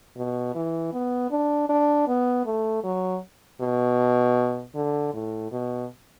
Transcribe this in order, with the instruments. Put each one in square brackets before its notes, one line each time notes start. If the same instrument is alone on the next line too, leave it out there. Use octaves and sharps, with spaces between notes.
[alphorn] B2
E3
B3
D4
D4
B3
A3
F#3
B2
D3
A2
B2